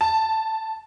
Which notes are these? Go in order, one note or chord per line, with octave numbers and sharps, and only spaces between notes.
A5